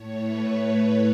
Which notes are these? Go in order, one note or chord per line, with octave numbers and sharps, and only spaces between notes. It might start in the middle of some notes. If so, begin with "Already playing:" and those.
Already playing: A2 A3 C#5
B4